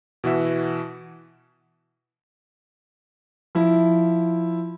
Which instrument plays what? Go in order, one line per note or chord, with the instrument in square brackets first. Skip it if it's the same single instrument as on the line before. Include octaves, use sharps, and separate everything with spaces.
[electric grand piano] B2 E3 F#4 E5
[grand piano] F3 E4